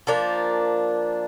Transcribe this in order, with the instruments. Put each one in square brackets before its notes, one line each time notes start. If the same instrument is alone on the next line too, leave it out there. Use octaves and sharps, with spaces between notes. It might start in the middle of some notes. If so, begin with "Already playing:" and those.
[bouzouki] F3 A#3 D4